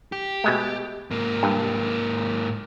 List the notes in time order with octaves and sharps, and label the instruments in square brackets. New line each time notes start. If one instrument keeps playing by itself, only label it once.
[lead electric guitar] G4
[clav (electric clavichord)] B2 G#3 A3
[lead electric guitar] G#2 A#3
[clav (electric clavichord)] G2